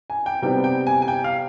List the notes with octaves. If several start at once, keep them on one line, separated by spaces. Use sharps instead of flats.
G#5
G5
C3 G3 B3 D#4 G5
G5
G#5
G#5
G5
F5